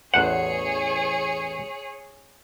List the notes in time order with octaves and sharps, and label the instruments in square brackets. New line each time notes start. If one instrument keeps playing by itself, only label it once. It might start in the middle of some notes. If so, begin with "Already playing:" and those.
[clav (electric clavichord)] A1 E2 C5 [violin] G#4 C#5 [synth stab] F#5